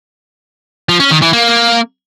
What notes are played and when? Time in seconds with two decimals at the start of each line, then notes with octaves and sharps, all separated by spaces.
0.89 F3
1.00 C#4
1.11 D#3
1.22 E3
1.33 A#3